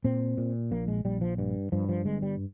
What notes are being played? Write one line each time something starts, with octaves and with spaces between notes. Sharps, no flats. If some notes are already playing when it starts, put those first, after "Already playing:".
A#2 C4
A#2
A#1 A#3
G#3
A#1 G3
F3
G2
G2 F3
F3
G1 G#3
G3